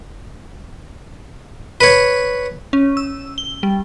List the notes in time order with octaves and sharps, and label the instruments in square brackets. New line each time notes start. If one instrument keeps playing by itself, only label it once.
[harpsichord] B4 C#5
[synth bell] C#4
E6
G7
G3